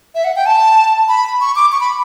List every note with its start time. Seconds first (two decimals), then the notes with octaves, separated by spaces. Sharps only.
0.15 E5
0.24 F#5
0.36 G5
0.46 A5
1.09 B5
1.41 C#6
1.56 D6
1.72 C#6
1.80 B5